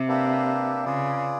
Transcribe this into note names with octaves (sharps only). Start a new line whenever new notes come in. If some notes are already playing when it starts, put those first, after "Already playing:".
Already playing: C3
A#3 D4 G4 B4 E5
C#3 F4 G#4 B4 D5